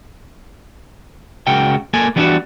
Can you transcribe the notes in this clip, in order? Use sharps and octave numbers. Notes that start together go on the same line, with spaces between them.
C#2 C#3 F#4 A#4 G5
A#3 A4 G#5
E3 G3 B3 D4 F4 F#4